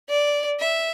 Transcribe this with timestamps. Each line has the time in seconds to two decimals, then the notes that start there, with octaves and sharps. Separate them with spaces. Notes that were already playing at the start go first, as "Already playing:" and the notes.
0.09 D5
0.60 E5